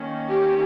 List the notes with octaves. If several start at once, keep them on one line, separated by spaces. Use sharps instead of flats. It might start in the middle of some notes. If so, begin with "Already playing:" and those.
Already playing: D#3 A#3 C#4
G4